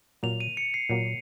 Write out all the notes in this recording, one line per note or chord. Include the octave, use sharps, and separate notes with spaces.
A#2 F#3 A#3 F7
D#7
C#7
C7
A#2 F#3 A#3